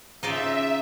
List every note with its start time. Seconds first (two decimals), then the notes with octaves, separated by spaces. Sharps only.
0.23 C#3 D#4 F4 D5 E5